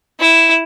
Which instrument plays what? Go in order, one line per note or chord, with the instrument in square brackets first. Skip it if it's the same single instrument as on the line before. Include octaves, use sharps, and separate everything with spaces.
[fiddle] E4